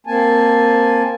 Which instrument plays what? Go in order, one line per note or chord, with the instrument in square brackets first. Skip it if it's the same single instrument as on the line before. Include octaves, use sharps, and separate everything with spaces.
[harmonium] A#3 C4 G#5 A5